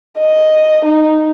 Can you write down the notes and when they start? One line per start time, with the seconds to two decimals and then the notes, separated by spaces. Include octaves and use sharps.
0.18 D#5
0.85 D#4